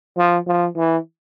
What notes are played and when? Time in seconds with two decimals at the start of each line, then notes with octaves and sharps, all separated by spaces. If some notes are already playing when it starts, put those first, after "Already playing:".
0.18 F3
0.47 F3
0.76 E3